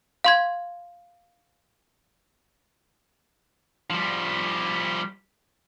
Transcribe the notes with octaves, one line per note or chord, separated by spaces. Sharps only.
F5 C6 G#6
F3 G3